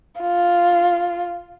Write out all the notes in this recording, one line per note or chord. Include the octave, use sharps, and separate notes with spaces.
F4